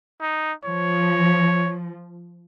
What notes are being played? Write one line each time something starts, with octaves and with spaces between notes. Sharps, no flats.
D#4
F3 C#5